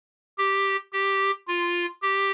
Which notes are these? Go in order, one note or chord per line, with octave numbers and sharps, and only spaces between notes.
G4
G4
F4
G4